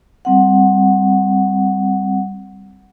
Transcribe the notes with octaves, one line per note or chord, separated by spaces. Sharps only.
G3 C4 F#5